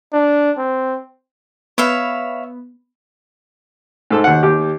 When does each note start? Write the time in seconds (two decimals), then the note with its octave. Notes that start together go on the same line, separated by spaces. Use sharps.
0.13 D4
0.58 C4
1.78 B3 C#5 E5 F5
4.11 G#2 A4 E6
4.24 D#2 F#5
4.43 D#2 G4